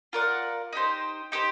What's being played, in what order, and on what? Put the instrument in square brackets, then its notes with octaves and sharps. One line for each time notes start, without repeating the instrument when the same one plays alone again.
[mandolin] F4 A#4 D5 F#5
D#4 G4 C5
D#4 G4 C5